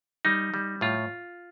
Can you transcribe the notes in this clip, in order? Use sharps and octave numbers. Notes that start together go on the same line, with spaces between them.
G3 D#4
G3
A2 F4